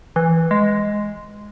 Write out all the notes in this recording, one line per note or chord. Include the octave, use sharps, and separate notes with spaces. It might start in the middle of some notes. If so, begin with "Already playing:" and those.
E3
G#3